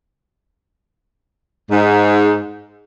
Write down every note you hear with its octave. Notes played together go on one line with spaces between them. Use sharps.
G#2